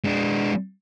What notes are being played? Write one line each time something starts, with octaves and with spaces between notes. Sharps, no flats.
G#3 D4